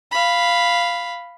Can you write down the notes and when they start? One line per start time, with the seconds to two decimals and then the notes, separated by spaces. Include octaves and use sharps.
0.12 F5 B5